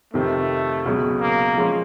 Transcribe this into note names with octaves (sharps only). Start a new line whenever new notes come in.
F2 C3 D#3 A3
C#2 B2 F#3
A#3
F3 G#3 C#4 F4